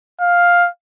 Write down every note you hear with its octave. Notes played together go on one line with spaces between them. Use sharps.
F5